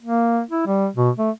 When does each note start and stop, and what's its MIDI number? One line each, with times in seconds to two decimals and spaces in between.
0.02 0.41 58
0.50 0.65 64
0.66 0.88 55
0.96 1.10 47
1.18 1.30 57